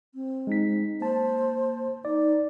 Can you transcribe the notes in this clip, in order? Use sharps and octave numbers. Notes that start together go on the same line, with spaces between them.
C4
G#3 D#4 B6
A#3 C5 A5
D#4 D5